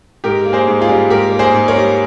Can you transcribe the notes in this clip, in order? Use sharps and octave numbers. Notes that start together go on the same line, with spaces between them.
G#2 G4 A#4
A#3
G#4 C5
G#2
F4 G#4
G3
G#2 G4 A#4
A#3
G#4 C5
G#2
A#4 C#5
G3